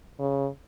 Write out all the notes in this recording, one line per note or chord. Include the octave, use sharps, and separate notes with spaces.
C#3